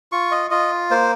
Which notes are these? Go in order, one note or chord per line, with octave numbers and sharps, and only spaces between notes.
F4 C#6
D#5
F4 D#5
A#3 C5